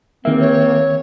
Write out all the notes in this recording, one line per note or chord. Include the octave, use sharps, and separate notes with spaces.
C#2 D#3 A#3 C4 E5
C#5